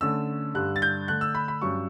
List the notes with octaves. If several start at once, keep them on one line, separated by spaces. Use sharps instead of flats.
D3 A3 C#4 E6
G2 D3 G3 F#6
A6
G6
D3 A3 D4 F#6
E6
B5
B5
G2 F#3 C#4 C#6